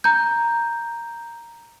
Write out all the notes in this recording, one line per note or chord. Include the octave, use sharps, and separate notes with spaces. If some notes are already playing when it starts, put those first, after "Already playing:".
A#5 G6